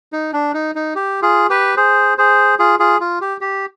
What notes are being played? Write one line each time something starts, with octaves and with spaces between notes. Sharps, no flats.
D#4
D4
D#4
D#4
G4
F4 G#4
G4 B4
G#4 C5
G#4 C5
F4 G#4
F4 G#4
F4
G4
G4